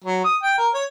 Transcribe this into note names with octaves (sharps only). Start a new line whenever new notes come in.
F#3
D#6
G5
A#4
C#5